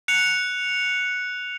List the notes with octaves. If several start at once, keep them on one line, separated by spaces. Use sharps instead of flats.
F#6 C#7 F7